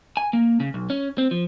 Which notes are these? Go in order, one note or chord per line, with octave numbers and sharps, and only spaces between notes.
G#5
A#3
C#3
B1
C#4
C4
F3